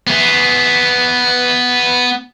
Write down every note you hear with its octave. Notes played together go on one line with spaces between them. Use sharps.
B3 G#4